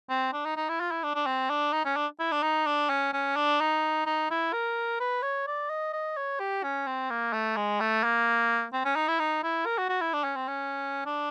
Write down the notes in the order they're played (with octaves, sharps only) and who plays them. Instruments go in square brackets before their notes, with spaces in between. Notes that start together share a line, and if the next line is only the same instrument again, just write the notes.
[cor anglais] C4
D4
D#4
D#4
E4
F4
E4
D4
D4
C4
D4
D#4
C#4
D4
E4
D4
D#4
D4
C#4
C#4
D4
D#4
D#4
E4
A#4
B4
C#5
D5
D#5
D#5
C#5
G4
C#4
C4
A#3
A3
G#3
A3
A#3
C4
C#4
D#4
E4
D#4
E4
A#4
F#4
F#4
E4
D4
C#4
C4
C#4
D4